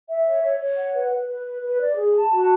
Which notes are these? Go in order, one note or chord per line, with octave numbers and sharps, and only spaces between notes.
E5
C#5
C#5
C#5
F#5
B4
B4
B4
B4
B4
D5
G#4
A5
F#4